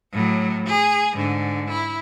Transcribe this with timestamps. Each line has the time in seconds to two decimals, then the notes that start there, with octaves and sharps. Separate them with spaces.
0.12 A2 F#3
0.67 G#4
1.13 G#2 D3
1.70 E4